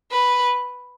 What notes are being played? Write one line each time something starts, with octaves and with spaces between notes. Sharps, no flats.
B4